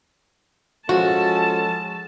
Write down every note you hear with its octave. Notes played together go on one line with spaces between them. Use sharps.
F3 G#3 C#4 F#4 A4 A5